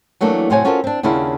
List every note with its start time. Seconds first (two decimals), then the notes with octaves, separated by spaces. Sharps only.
0.21 E3 F#3 A3 A#3 D4
0.50 A2 C3 F#3 C5 C#5 G#5
0.65 C#4 F4 F#4 A4 A#4 C5
0.84 C4 D4
1.03 D#2 C#3 D4 E4 F4 F#5